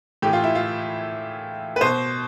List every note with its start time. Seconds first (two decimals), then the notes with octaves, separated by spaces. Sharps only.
0.22 A2 E3 G4
0.33 F4
0.44 E4
0.55 F4
1.76 B4
1.81 B2 C5